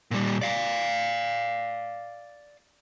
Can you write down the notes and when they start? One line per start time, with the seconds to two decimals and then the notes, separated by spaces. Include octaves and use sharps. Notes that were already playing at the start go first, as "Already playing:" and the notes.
0.11 A#2 G3
0.42 D5 F5